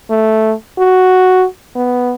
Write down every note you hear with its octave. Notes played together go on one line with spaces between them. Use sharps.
A3
F#4
B3